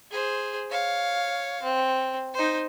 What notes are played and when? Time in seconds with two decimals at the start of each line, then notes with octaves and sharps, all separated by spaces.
0.11 G#4 C5
0.70 C#5 F5
1.63 C4
2.34 D#4 C5